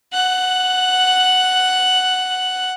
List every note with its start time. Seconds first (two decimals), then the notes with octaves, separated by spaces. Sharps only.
0.13 F#5 F#6